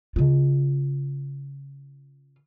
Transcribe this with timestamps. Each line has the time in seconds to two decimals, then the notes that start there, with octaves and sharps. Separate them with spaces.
0.16 C#3 F4